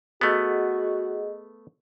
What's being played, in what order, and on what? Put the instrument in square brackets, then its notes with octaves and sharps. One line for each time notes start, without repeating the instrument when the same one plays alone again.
[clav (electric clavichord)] A3 B3 [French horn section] F#4 [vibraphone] G#4 D#5